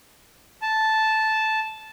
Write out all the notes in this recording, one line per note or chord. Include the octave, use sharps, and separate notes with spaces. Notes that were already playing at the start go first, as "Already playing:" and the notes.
A5